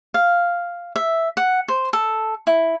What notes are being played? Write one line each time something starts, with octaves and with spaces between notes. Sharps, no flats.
F5
E5
F#5
C5
A4
E4